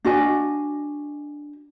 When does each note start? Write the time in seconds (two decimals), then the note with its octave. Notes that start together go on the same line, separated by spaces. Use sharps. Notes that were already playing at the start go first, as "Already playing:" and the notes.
0.05 D4 F#4 D#5 G#5